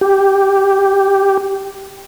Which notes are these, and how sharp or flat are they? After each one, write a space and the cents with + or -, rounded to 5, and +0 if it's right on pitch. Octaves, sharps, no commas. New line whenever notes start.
G4 +0